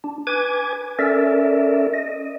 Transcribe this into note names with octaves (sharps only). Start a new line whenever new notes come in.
D4
B4 G#5 D6 G#6
C#4 A4 A#4 D5 E5
D#5